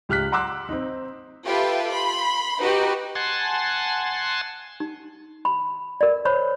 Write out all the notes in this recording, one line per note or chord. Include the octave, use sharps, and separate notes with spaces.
C#2 G4 F6 F#6 B6
F#5 A#5 C6 D6 E6 F#6
C4 D#4
F4 G4 A4 B4 E5
B5 C6
D#4 F#4 G4 B4
F#5 G#5 A5 C6
D#4
B5
A#4 D5
C5 C#5 B5